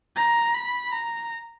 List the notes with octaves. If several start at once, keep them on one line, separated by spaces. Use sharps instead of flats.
A#5
B5
A#5